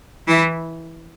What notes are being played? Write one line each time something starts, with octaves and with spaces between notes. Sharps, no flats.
E3 E4